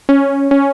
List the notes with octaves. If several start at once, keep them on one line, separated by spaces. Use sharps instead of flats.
C#4
C#4